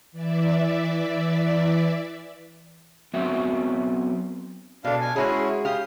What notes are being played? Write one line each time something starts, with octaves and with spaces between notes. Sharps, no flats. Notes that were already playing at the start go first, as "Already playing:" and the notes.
E3 D5 E5
F#3 B3 C4 F#4 E5
B2 D4 A4 F5
G#5
G#3 C#4 E4 F#4 G#4
G4 F5 D#6